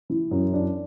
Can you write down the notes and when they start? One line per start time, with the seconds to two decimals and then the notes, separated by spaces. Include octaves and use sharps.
0.10 E3
0.31 F#2
0.53 D4